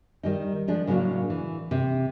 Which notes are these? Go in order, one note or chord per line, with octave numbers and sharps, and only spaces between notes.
D#3 G3 D#4
F3 G#3 D4
A2 C#3 F#3 A#3 D4
E3
C3